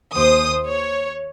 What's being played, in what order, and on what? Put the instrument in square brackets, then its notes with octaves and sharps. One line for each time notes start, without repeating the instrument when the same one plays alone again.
[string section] D#2 C5 D#6
C#5